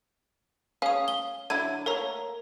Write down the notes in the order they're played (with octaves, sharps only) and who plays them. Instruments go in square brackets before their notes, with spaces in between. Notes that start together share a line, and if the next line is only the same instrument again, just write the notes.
[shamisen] C#4 G#4 [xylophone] F5 D#6
[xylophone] G7
[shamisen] D3 F#3 E4 [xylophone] G#6 D#7
[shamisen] A3 A#3 [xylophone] A#4 C#5 A#5